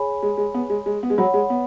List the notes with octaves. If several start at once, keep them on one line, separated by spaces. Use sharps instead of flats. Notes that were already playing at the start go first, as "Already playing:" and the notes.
Already playing: G#4 C#5 G#5 B5
G#3
G#3
B3
G#3
G#3
B3
G#3
F#3 C#5 F#5 B5
G#3
B3